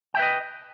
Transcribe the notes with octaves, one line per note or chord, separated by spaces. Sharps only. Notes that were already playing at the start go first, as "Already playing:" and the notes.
B4 D#5 E5 G5